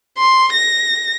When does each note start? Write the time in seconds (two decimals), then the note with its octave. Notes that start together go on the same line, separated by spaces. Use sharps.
0.18 C6
0.53 A#6